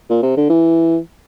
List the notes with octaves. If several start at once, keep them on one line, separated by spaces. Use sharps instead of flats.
A#2
C3
D3
E3